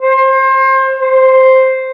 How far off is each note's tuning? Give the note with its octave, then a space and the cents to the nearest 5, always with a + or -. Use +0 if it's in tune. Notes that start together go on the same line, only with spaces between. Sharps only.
C5 +30
C5 +0